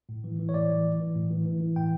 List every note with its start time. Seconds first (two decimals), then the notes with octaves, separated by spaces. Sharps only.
0.09 A2
0.24 E3
0.39 E3
0.49 C#5
0.54 A2 D5
0.70 E3
0.85 E3
1.00 E3
1.15 A2
1.30 E3
1.45 E3
1.61 E3
1.76 A2 G5